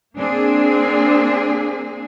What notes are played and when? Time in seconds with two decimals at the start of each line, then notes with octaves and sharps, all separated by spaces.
0.18 A#3 C4 D4 G#4